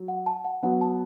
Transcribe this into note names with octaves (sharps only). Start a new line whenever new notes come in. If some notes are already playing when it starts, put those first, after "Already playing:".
Already playing: F#3
F#5
A5
F#5
F#3 B3 F#5
A5